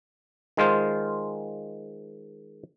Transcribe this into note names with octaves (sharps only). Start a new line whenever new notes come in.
D#3 G#3 F4 C5